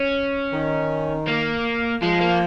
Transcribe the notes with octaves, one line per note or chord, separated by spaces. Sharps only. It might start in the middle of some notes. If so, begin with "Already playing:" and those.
Already playing: C#4
D#3
A#3
F3 G#3
A#3